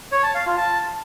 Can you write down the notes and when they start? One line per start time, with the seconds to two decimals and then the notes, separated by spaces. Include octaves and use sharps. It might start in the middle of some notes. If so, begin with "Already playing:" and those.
0.12 C#5
0.23 A5
0.35 F5
0.46 F4
0.57 A5